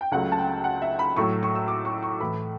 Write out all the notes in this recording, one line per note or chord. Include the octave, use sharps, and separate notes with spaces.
G5
C#2 C#3 F#3 A3 F#5
A5
G5
F#5
E5
B5
A2 F#3 A3 C#6
C#6
E6
D6
C#6
C#6
A2 E3 A3 B5